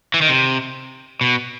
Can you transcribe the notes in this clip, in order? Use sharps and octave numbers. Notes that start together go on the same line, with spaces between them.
E3
D#3
C3
B2